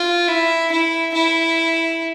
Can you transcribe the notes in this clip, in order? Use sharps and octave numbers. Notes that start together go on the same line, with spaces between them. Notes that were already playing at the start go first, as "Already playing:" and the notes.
Already playing: F4
E4
E4
E4